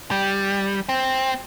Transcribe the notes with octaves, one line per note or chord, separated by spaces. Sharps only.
G3
C4